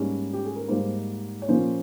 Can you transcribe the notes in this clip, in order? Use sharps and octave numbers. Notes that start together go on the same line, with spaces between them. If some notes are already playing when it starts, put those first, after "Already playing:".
Already playing: G#2 G3 A#3 C#4
G4
G#4
A#4
G#2 G3 A#3 D#4 C5
C#5
A#2 F3 A#3 C#4 C5